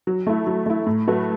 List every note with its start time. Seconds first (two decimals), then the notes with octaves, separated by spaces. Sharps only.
0.07 F#3
0.27 A3 E4
0.47 F#3
0.66 A3 E4
0.87 A2
1.07 F#3 A3 F#4 B4